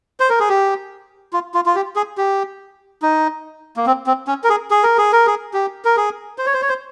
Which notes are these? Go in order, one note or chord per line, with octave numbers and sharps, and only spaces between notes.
C5
A#4
G#4
G4
F4
F4
F4
G4
G#4
G4
D#4
A#3
C4
C4
C#4
A#4
G#4
G#4
A#4
G#4
A#4
G#4
G4
A#4
G#4
C5
C#5
C5
C#5
C5